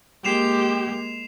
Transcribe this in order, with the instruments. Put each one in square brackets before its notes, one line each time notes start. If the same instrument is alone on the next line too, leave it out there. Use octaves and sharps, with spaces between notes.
[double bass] G#3 A#3 [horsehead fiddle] G4 [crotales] C7 E7 F7